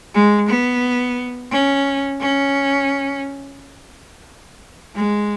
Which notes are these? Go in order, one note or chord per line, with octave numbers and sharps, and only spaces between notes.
G#3
B3
C#4
C#4
G#3